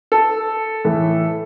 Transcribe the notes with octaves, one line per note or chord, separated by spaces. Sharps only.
A4
A2 E3 A3